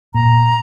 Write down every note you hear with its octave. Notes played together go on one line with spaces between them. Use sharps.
A#2 A#5